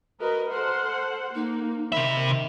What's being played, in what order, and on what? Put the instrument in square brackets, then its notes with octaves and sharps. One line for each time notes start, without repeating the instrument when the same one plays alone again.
[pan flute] F#4 [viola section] A#4 B4 D#5
[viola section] A4 C5 F#5 [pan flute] F6
[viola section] A#3 [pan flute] D#4
[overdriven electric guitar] C3 E5 [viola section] D#3 [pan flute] B5